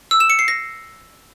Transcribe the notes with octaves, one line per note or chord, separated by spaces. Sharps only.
E6
E7
C#7
C7
A#6